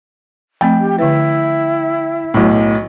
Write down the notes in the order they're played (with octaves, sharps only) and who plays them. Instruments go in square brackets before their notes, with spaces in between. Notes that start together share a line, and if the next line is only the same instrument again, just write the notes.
[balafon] F3 A3 C4 [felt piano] G5
[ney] G4
[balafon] D3 B4 [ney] E4
[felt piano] B1 A2